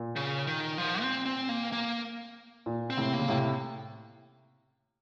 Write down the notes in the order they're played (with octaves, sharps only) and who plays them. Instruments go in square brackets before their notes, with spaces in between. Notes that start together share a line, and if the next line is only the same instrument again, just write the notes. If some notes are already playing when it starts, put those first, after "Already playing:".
Already playing: [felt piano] A#2
[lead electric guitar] C#3
D#3
F3
C4
C4
A#3
A#3
[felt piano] A#2
[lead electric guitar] C4
[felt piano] A2 C3
[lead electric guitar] A#3
[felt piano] C#3
A2 C3